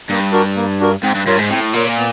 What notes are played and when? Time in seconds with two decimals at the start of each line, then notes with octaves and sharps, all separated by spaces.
0.09 G2 A#3
0.32 D4 F#4 A#4
0.56 A#3
0.80 D4 F#4 A#4
1.03 G#2 C4
1.15 G2
1.26 G2 F4 A#4 C#5
1.38 G#2
1.50 A2 C4
1.73 A#2 F4 A#4 C#5
1.97 B3